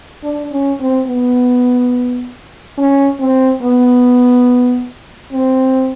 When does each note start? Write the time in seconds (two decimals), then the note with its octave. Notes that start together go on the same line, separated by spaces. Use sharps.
0.24 D4
0.52 C#4
0.81 C4
1.08 B3
2.78 C#4
3.20 C4
3.63 B3
5.33 C4